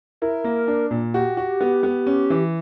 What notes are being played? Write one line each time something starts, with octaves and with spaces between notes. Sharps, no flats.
E4 A#4
A#3
D4
A#2
F#4 G4
F#4
B3
B3
C#4
E3